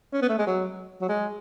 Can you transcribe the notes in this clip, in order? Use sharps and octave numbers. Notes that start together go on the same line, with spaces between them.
C#4
B3
A3
G#3
F#3
F#3
G#3